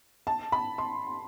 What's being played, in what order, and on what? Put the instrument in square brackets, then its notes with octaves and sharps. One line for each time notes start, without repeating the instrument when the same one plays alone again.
[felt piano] A5
B5
C6